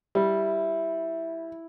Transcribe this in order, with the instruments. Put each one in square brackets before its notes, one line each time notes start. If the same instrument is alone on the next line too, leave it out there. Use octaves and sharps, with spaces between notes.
[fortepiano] G3 [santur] E4